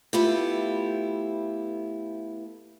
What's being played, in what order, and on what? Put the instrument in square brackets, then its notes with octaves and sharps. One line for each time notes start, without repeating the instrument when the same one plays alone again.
[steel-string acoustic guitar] A3 B3 E4 F4 G4